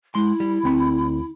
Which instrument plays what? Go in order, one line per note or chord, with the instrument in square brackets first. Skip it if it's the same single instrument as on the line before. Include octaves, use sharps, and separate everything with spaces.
[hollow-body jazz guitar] G#3 C6 [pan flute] E4
[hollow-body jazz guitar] G3
D2 C4 B5